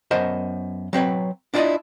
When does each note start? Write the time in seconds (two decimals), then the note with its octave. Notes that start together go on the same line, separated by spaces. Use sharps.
0.11 F#2 B3 A#4 C5 D#5 A5
0.93 F#3 C4 B4 C#5
1.54 D4 E4 F4 C5 D5 D#5